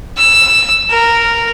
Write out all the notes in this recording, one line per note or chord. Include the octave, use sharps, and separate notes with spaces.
E6
A#4